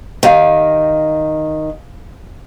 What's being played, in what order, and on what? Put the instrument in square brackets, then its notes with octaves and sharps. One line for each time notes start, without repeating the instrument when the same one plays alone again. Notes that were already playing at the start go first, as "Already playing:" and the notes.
[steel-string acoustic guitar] D#3 [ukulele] G4 F5